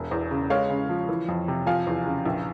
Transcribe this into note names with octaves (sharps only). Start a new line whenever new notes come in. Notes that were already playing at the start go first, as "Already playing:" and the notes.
Already playing: E1
E2
C#3
G#3 C#5 F5
C#3
F3
E3
F2
C3
F3 F5 G#5
E2
C#3
A#1